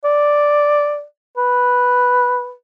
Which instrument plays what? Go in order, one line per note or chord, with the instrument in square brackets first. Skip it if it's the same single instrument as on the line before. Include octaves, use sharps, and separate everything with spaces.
[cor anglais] D5
B4